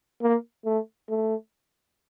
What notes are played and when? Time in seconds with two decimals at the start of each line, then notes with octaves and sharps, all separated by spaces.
0.22 A#3
0.65 A3
1.09 A3